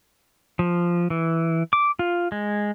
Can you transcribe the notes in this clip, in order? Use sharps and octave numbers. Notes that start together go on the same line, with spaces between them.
F3
E3
D6
F4
G#3